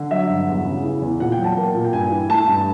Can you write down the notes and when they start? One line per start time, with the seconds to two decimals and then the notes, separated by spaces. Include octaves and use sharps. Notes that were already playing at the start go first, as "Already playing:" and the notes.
Already playing: D3
0.11 F#3 E5
0.29 G2
0.48 E2
0.65 C#3
0.84 E3
1.02 E2
1.20 A#2 F#5
1.32 G5
1.39 F#3
1.44 A5
1.57 A#3
1.74 A#2
1.85 G5
1.93 G2 G#5
2.11 E3
2.29 A3 A5
2.47 G2